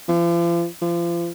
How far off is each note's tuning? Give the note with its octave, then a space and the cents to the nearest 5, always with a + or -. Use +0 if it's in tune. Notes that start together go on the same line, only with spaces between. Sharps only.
F3 -40
F3 -35